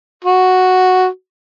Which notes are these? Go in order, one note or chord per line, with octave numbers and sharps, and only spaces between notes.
F#4